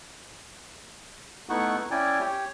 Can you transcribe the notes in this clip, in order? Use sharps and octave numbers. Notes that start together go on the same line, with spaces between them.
A3 B3 D#4 E4 F#5 C#6
C#4 E4 D5 G5 G#5
G4 C#5